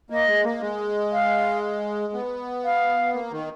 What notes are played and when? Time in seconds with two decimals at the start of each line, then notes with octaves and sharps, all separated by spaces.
0.10 A#3 D#5
0.27 G#3
0.44 A#3
0.61 G#3
1.12 F5
2.13 B3
2.64 F5
3.14 A#3
3.32 D#3